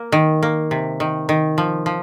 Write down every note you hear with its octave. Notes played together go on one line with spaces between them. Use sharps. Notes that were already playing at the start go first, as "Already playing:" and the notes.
Already playing: A#3
D#3
A#3
C3
D#3
D#3
F3
F3